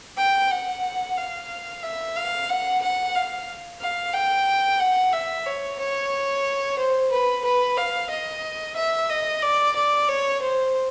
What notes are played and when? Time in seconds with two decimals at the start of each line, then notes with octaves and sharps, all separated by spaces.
0.17 G5
0.51 F#5
1.17 F5
1.83 E5
2.16 F5
2.49 F#5
2.82 F#5
3.15 F5
3.81 F5
4.13 G5
4.80 F#5
5.12 E5
5.46 C#5
5.79 C#5
6.78 C5
7.11 B4
7.44 B4
7.77 F5
8.10 D#5
8.76 E5
9.09 D#5
9.42 D5
9.75 D5
10.08 C#5
10.42 C5